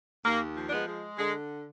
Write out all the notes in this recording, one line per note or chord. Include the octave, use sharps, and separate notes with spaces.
D#2 A#3
F3
D4
G#3 B3
G#3
D3 G#3